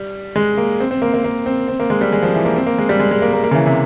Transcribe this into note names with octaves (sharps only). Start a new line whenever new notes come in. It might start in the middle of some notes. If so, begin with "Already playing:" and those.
Already playing: G3
G#3
A#3
C4
C4
A#3
A#3
A#3
C4
C4
A#3
G#3
G3
G#3
F3
E3
A#3
C4
A#3
G#3
G3
G#3
G#3
A#3
A#3
A#3
C#3
E3
C3